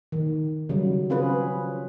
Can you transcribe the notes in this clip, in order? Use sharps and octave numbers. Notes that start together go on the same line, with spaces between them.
D#3
C#3 F#3 G3
C4 C#4 F4 G#4 B4